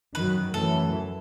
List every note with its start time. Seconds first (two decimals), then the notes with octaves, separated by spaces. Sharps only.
0.15 F#2 D#3 F#3 B4
0.54 F#2 E3 A3 A4